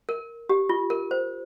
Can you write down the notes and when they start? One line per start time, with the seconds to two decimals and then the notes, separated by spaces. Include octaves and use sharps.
0.09 A#4
0.49 G4
0.69 F4
0.90 A#4
1.11 C5